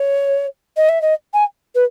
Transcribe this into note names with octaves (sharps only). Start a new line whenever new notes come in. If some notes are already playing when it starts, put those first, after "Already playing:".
Already playing: C#5
D#5
E5
D#5
G#5
B4